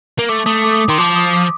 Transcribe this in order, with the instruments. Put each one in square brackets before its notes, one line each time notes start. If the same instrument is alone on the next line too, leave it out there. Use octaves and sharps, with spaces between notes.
[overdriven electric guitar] A#3
[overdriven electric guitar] A3 [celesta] D6
[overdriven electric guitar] A3 [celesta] D#6
[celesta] D6
D#6
D6
[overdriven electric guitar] D#3 [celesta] C6
[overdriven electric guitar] F3 [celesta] D6
[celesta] D#6
D6